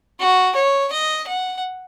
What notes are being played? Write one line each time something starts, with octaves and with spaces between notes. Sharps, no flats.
F#4
C#5
D#5
F#5